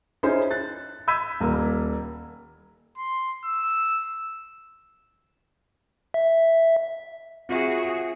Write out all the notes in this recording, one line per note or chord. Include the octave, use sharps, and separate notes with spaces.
C#4 D#4 E4 G#4 C5
F#6 A6
B5 E6 G6 G#6 B6 D#7
D#1 A#3
C6
E6
E5
C4 F4 F#4 G#4 E5